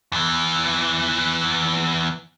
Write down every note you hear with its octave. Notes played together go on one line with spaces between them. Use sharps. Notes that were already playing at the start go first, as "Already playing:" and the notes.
E2 E3